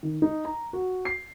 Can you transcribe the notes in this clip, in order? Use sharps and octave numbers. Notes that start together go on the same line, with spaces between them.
D#3
D#4
A#5
F#4
C7